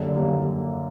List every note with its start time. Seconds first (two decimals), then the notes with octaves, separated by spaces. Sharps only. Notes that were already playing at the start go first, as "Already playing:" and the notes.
Already playing: F#2 D3 G3 A#3
0.16 F#2 D3 G3 A#3